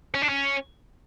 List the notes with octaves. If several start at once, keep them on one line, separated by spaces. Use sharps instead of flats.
C#4
D4
C#4